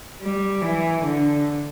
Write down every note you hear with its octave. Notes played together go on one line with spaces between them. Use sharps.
G3
E3
D3